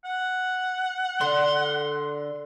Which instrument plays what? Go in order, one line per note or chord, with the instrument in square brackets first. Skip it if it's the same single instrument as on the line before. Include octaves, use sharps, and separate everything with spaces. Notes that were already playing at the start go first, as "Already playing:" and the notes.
[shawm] F#5
[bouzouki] D3 [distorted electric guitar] C6